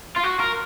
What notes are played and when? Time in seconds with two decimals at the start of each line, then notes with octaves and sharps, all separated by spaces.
0.16 F4
0.24 F#4
0.40 A#4